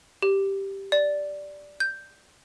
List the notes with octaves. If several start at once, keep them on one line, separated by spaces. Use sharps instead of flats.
G4
D5
G6